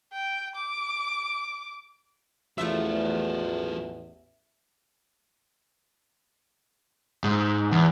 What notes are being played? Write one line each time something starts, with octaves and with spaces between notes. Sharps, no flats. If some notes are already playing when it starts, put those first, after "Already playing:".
G5
D6
A1 E2 F3 F#3 A3 F4 E5
G#2
E2